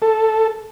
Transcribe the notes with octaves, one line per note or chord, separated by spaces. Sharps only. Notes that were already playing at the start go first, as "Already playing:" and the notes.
A4